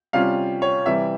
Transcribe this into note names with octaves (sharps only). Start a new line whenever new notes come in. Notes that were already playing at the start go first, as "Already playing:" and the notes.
C3 G3 C#4 F4 F5
C#5
C3 E3 G3 E5